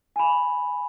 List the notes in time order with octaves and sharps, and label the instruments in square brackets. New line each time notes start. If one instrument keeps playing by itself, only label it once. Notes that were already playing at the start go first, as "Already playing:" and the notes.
[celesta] G#5 B5